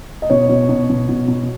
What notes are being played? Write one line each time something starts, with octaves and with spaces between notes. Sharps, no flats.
D#5
B2 C#5
B2
B2
B2
B2
B2